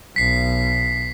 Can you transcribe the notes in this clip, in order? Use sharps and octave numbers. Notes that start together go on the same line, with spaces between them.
B1 B6 C7